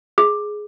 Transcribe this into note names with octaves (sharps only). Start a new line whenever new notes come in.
G#4